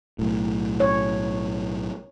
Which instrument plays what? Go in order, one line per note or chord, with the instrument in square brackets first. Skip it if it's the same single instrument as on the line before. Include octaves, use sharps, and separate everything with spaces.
[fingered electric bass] B1 A2
[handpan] C#5